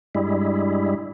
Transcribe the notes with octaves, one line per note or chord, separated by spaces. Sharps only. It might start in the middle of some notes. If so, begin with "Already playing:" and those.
G2 G3 G#3 E4